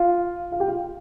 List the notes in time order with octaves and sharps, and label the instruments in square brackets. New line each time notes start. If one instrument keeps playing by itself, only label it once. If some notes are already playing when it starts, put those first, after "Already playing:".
Already playing: [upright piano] F4 F5
F4 F5
G4 G5
F4 F5